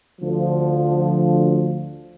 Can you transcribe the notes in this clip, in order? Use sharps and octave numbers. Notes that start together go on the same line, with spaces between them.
D2 D3 F3